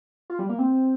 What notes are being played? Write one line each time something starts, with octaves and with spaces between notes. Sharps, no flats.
F4
G3
A#3
C4